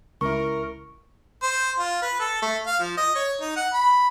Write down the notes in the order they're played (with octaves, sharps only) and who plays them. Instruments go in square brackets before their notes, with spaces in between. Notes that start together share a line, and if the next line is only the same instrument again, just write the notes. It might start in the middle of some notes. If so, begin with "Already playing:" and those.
[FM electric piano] C#2 E4 [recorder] A#4 [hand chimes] C#6
[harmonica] C5
F4
B4
A4
A3
F5
F3
D#5
C#5
D#4
F#5
B5